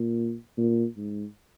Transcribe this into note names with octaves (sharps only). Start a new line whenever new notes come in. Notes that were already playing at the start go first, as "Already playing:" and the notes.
Already playing: A#2
A#2
G#2